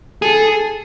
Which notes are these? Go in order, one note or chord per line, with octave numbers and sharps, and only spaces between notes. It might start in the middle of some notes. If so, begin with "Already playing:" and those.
G#4 A4